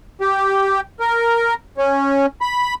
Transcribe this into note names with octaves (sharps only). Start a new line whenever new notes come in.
G4
A#4
C#4
B5